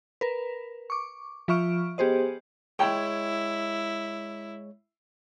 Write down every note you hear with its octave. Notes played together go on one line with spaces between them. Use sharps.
A#4 B4
C#6 D6
F3 F4 E5 C#6 F6 D7
B3 G4 G#4 C5 D#5
G#3 E4 C#5 G5